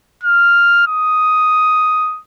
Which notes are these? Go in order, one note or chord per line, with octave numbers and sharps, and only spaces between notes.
F6
D#6